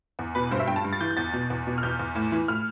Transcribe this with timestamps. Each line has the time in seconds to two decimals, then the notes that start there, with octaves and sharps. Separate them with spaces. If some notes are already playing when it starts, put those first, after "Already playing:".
0.19 E2
0.35 B2 B4
0.51 G2 C5
0.59 E5
0.68 G2 G5
0.76 A5
0.84 G2
0.93 A6
1.01 E3 G6
1.11 G6
1.17 E2 A6
1.33 B2
1.50 E2
1.67 B2
1.78 F6
1.83 E2 G6
1.99 E2
2.15 A2
2.32 E3
2.48 A2 F6